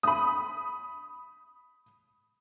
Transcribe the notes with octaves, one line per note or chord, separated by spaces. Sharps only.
B5 D#6